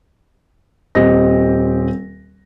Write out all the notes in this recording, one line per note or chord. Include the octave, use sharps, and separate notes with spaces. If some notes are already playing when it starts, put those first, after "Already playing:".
D#1 C4 G4 D#5 A#6